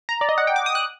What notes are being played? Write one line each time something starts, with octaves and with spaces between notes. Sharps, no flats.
A#5
D5
D#5
F#5
G5
D6
D#6
F#6